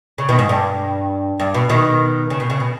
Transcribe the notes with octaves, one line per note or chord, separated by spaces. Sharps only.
C#3
B2 D#3
G#2
G2
G2
B2
B2 D#3
C#3
B2
C#3
B2